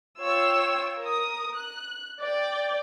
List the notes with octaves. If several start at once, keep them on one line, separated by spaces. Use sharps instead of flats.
F4 C#5 G5 E6
A#4 D#6
F#6
D5 G5